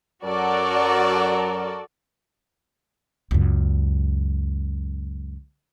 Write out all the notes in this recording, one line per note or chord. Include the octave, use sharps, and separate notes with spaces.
F#2 F#3 F#4 A4 A#4 D5
C#2 F#2